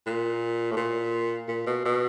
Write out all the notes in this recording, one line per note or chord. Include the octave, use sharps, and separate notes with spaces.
A#2
A2
A#2
A#2
B2
B2